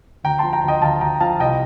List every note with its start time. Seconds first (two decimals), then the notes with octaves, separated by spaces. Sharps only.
0.24 D2 G5 A#5
0.39 F3 A5 C6
0.53 G5 A#5
0.64 D2 D#5 G5
0.82 D2 F5 A5
1.01 D2 G5 A#5
1.20 F3 F5 A5
1.40 C2 D#5 G5